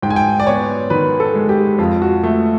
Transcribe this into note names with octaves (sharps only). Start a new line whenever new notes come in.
G#2 G5
G#5
G5
D5
B3 C#5
D#3 B4
A4
G#3
G4
F2 F4
F#4
A3